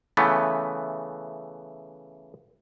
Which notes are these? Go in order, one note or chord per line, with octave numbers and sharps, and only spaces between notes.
C#3 E3 A3 B3